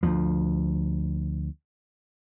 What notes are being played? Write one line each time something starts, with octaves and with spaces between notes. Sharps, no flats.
D2 F3